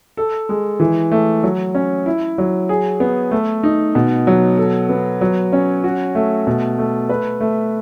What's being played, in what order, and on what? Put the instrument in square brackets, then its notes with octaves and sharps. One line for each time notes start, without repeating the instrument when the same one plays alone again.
[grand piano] A4
G#3
E3
A3
F#3
C#4
E4
F#3
G#4
B3
A3
D#4
B2
F#3
A4
B3
F#3
C#4
F#4
A3
B2
A3
B4
A3